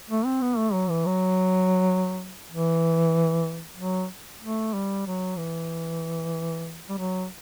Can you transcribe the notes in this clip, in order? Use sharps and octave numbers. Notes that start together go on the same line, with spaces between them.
A3
C4
B3
A3
F#3
E3
F#3
E3
F#3
A3
G3
F#3
E3
G3
F#3